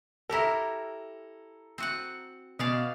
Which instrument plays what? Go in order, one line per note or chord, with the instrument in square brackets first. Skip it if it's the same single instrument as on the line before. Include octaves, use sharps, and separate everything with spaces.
[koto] E4 G4 A#4 [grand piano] A4 A#5
[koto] C4 F#4 F#5
[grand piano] B2 [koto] C#4 D5 F5